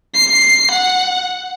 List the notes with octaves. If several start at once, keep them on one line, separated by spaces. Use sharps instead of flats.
C7
F#5